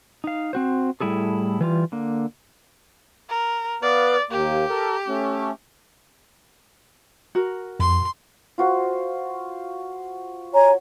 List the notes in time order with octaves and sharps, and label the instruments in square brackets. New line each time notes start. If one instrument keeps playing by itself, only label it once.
[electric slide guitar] D#4 F5
C4 F#4 C5
A2 G3 E4 G#4 A4
E3 G3 F4
D3 A#3
[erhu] A#4
[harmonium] B3 B4 F5 [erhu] D5
[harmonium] D#2 A#3 [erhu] G4
[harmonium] A4 A#4
A3 C#4
[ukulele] F#4 A#4
[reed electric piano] F2 [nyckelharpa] C6
[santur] F4 F#4 C5
[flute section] C#5 G#5 A#5